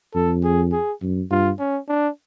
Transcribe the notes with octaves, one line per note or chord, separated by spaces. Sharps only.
F2 A4
G#4
G#4
F#2
G2 F4
C#4
D4